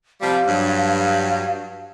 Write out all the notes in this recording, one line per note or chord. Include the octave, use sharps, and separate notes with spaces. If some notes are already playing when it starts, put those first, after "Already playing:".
C3 F3 G3 F5
G2 F#3